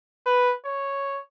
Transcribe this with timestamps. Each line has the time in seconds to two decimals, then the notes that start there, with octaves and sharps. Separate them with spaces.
0.26 B4
0.65 C#5